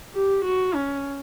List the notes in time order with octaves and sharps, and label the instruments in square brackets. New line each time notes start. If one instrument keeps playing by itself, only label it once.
[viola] G4
F#4
C#4